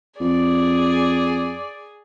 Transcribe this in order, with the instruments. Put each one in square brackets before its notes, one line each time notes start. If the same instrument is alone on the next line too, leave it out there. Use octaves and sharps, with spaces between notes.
[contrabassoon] F2 [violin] G#4 [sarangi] D5